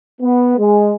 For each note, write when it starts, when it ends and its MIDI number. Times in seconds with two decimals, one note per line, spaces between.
0.22 0.55 59
0.58 0.94 56